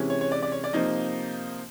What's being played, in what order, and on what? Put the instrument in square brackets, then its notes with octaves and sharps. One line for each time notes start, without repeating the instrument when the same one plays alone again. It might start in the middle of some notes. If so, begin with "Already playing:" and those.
Already playing: [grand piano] C3 E3 G#3 C#4
C#5
C#5
D5
D5
C#5
D5
C3 F3 A#3 D#4 D#5